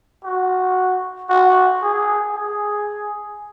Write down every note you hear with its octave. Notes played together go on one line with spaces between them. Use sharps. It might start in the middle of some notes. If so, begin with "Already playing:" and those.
F#4
F#4
G#4
G#4